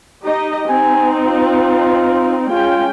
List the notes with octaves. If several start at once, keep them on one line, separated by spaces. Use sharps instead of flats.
D#4 G4 D#5
C4 D#4 G#5
F4
G#3 C#4 F4 G5